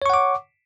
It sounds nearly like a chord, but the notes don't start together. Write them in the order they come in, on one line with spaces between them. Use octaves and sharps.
C#5 C#6 F#5 D6